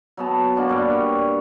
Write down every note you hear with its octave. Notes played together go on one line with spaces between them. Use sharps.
F#3 B3 A5
A#3 D4 F#4
G2 G3 D6
C#5